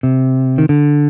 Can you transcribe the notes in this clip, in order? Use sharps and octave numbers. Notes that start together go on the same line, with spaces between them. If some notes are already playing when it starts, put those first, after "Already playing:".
C3
D#3
D3